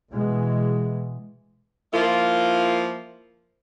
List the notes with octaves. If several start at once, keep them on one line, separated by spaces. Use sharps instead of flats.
B2 E3 G#3
F3 A#3 E4 F4